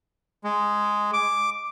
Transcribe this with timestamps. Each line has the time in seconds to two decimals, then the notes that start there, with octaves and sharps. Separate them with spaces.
0.44 G#3
1.13 D6